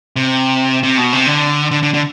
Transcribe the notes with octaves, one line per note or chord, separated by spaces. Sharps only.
C3
C3
B2
C3
D3
D3
D3
D3